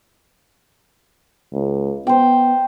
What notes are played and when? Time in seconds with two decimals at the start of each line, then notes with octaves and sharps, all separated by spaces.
1.53 C#2
2.07 B3 C5 G5